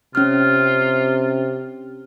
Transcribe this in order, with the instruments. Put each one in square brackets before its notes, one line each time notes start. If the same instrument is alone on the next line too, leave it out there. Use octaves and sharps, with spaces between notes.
[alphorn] C3 [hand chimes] C#4 F6 [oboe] F4